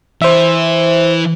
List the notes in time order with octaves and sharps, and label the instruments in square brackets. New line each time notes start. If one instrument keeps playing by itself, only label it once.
[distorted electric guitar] E3 [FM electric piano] C5 E5